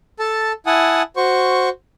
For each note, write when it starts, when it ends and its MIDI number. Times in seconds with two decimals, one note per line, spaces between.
0.19 0.52 69
0.19 0.52 81
0.66 1.02 64
0.66 1.02 78
0.66 1.02 80
0.66 1.02 81
0.66 1.02 87
1.16 1.69 66
1.16 1.69 72
1.16 1.69 85